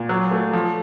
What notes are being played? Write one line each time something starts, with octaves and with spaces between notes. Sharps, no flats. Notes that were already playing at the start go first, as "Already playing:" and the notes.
Already playing: A#2
F#3
A3
F3